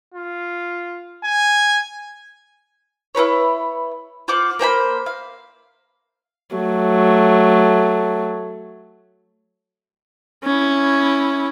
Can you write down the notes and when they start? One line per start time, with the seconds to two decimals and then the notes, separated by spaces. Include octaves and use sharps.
0.14 F4
1.24 G#5
3.15 E4 F4 B4 C#5
4.28 F4 C5 F#5 D6
4.59 A#3 C5 G5 B5
5.06 F5
6.56 F#3 A3
10.44 C#4 E4